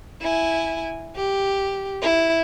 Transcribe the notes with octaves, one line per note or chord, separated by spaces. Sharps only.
E4 G#5
G4
E4